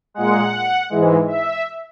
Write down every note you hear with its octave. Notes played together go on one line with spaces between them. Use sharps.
A#2 G#3 F#5
G#2 E3 G#3
E5